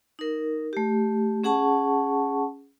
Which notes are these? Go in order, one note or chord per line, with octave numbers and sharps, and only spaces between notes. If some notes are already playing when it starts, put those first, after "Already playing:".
D#4 A#4
A3 G4
C#4 G#4 F#5 A5 C#6